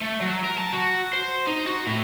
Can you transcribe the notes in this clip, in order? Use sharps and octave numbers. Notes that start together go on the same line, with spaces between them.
A3
F#3
A#4
A5
F#4
C5
D#4
F#4
A2